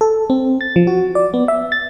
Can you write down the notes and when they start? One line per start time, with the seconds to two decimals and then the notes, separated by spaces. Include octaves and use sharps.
0.01 A4
0.30 C4
0.61 A6
0.76 F3
0.87 F#4
1.15 D5
1.34 B3
1.48 E5
1.72 A6